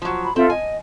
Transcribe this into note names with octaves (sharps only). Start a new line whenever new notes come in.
F3 F#3
B5
C4 F4 A4 E5
D#5 G#5